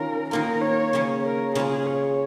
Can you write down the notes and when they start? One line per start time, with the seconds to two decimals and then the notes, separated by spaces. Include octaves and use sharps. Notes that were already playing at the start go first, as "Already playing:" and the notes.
Already playing: D#3 C#4 F4 A#4
0.31 D#3 A#3 F4 A#4
0.62 C#5
0.93 C#3 A#3 C#4
1.25 A#4
1.55 C#3 G#3 F4 G#4
1.87 C#5